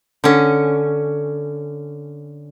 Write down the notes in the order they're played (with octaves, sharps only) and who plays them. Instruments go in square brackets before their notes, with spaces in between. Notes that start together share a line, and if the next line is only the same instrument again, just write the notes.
[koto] D3 C#4